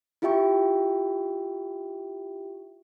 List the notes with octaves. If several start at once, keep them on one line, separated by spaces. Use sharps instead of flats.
E4 F4 G4 E5 G5 C#6